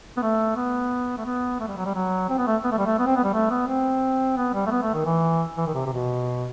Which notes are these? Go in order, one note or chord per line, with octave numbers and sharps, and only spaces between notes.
B3
A3
B3
A3
B3
A3
G3
F#3
G3
F#3
C4
B3
A3
B3
A3
G3
A3
B3
C4
B3
G3
A3
B3
C4
B3
G3
A3
B3
A3
D#3
E3
E3
D#3
C3
C3
B2